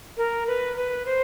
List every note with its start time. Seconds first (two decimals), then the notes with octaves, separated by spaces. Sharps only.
0.17 A#4
0.47 B4
0.77 B4
1.06 C5